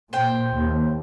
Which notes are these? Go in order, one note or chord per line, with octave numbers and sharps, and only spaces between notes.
A#2 C5 G5
D#2